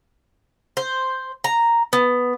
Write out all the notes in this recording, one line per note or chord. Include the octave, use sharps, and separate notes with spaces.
C5
A#5
B3